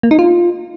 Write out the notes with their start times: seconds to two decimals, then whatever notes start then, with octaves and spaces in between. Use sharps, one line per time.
0.03 A#3
0.11 D#4
0.19 F4